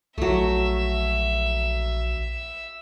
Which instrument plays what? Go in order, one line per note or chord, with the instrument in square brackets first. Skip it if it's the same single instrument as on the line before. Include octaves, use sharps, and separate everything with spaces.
[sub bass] A#1 [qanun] F#3 A3 [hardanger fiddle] E5